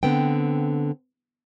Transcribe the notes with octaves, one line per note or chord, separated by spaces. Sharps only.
D3 B3 C4 G5